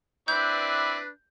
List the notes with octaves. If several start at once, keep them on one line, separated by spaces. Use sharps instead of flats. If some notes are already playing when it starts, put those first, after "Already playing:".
C4 D4 E4 B4 D5 G6